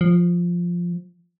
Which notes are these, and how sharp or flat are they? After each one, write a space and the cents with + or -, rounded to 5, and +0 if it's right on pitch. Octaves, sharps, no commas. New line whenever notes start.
F3 +0